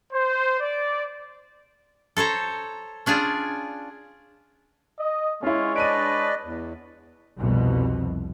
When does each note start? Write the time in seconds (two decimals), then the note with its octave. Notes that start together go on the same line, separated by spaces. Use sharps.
0.13 C5
0.60 D5
2.17 A4 C5 C#5 A#5
3.06 C#4 D4 F4 G#4
4.99 D#5
5.43 G#3 C#4 E4 F4 C#5
5.76 D4 B4 D5 D#5 D7 D#7
6.44 E2
7.38 C2 F2 B2